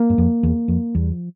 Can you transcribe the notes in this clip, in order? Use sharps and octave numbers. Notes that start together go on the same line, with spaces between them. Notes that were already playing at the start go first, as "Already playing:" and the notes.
Already playing: A#3
G2
F2
E2
F2
E2 G3
F3